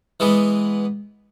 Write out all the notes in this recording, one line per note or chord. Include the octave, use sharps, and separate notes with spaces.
E3 G#3 B3